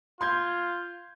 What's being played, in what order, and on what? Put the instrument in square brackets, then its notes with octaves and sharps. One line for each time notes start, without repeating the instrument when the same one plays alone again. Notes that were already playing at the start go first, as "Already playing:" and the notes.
[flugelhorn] F4 [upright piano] C6 G6 G#6